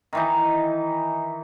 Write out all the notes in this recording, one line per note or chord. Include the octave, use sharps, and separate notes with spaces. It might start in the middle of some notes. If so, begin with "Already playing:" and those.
D#3 E3 D#4